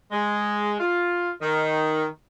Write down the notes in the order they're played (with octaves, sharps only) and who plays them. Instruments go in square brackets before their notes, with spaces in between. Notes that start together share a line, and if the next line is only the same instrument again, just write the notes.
[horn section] G#3
F4
D#3